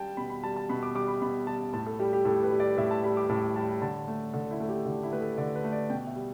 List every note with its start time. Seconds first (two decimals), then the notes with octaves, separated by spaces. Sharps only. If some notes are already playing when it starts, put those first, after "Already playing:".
Already playing: G3 G5 A5
0.17 B2 B5
0.30 B5
0.44 G3 A5
0.56 A5
0.69 B2 B5
0.83 D6
0.95 G3 D6
1.08 B5
1.22 B2 B5
1.47 G3 A5
1.74 A2 A5
1.86 A4
1.99 G3 G4
2.13 G4
2.25 A2 A4
2.43 B4
2.51 G3
2.60 D5
2.77 A2 E5
2.91 A5
3.04 G3 B5
3.17 D6
3.29 A2 A5
3.56 G3 A5
3.82 D3 A5
4.08 A3
4.34 D3 A4
4.51 E4
4.60 A3 A4
4.69 G4
4.86 D3 E4
5.03 E4
5.12 A3 B4
5.21 A4
5.38 D3 D5
5.55 B4
5.64 A3
5.72 D5
5.90 B2 G5
6.07 E5
6.16 G3